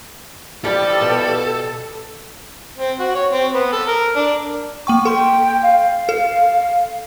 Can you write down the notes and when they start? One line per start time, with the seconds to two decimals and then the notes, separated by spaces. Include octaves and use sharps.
0.65 E3 F3 G3 G4 A4
1.01 B2
2.79 C4
2.99 F#4
3.15 C#5
3.32 C4
3.54 B3
3.73 A4
3.88 A#4
4.16 D4
4.87 A#3 G5 C#6
5.05 A4 G5 C6
5.62 F5
6.09 A4